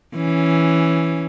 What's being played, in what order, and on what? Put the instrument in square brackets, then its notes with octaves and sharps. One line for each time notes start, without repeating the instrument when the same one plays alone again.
[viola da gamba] E3 C#4